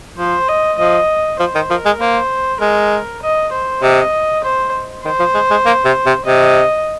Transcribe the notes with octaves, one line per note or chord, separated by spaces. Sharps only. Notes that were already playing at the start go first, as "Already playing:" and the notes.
F3 C5
D#5
F3 D#5
F3 C5
D#3
F3 A#4
G#3
A#3 C5
G#3 A#4
D#5
C5
C3 D#5
C5
D#3 C5
F3
G#3
G#3
A#3
C3
C3
C3 D#5